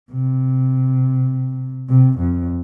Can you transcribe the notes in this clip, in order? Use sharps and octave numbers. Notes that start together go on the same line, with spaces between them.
C3
C3
F2